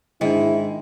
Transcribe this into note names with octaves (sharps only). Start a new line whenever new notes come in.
G#2 D#3 G#3 D4 E4 D#5